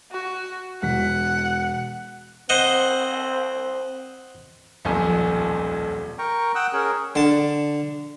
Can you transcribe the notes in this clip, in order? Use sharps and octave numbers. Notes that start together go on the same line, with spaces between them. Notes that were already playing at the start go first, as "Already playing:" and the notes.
F#4
E1 F#5 B6
C4 C5 D#5 F#5
D#1 B1 F2 G#5
A#4 G5 A#5 C#6
F#5 G5 D#6 E6 F#6
C#4 G#4 A#4
D3 A5